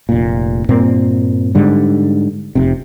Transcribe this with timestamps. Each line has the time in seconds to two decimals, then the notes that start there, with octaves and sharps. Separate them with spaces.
0.09 F1 A#2
0.69 G2 A#2 A#3 C4
1.55 G#2 D3 G3
2.55 F1 C3